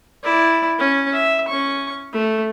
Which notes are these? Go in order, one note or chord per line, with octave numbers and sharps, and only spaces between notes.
E4 D5
C#4
E5
C#4 C#6
A3